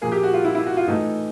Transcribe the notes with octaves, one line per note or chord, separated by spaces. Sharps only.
A#2 F3 A#3 G#4
G4
F#4
F4
E4
E4
F#4
F4
A2 E3 A3 D#4